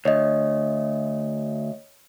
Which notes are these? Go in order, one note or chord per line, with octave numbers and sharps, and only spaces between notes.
D2 C#5 D#5